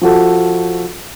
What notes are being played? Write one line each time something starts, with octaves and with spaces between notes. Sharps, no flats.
F3 F#4 A4